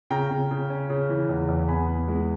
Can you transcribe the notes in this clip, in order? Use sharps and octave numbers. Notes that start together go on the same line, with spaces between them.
C#3 G5 A#5
C#3
C#3
C#4
C#3
E3
E2
E2
B3 G#5 B5
B3
G#3